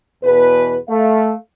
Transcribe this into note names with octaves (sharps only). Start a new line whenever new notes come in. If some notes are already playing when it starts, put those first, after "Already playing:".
E2 B2 B4
A3 F5